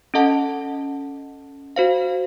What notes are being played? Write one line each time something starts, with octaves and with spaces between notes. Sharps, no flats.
C#4 A4 D#5 F#5 A5
F#4 C5 F5